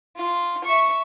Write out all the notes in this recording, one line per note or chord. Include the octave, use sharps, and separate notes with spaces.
F4
E5 C#6